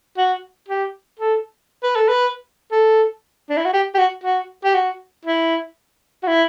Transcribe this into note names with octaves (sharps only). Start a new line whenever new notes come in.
F#4
G4
A4
B4
A4
B4
A4
D4
E4
F#4
G4
G4
F#4
F#4
G4
F#4
E4
F#4
E4